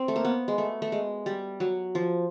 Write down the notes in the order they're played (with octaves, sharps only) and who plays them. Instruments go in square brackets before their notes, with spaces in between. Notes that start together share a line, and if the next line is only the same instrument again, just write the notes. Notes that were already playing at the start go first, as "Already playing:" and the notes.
Already playing: [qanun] C4
A3
A#3
B3
G#3
A3
A3
G#3
G3
F#3
F3